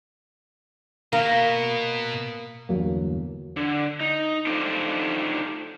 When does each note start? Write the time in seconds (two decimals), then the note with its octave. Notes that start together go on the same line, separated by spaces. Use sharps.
1.13 B2 A#3
2.69 G1 E2 F#3 A#3
3.56 D3
4.00 D#4
4.47 D4 D#4 F4 G4 A4 C5